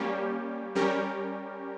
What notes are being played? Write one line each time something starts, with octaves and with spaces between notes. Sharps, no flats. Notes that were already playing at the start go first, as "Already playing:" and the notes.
Already playing: G3 A#3 C#4 G4
G3 C#4 G4 A#4